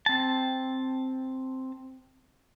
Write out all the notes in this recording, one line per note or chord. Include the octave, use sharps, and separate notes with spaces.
C4 A5